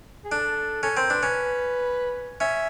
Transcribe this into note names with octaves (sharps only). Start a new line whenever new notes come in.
G#4
D4 A4
C#4 A4
C4 A#4
D4 B4
C#4 B4
C#4 E5